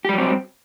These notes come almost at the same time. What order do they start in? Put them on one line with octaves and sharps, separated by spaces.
G4 G3 F#3 C4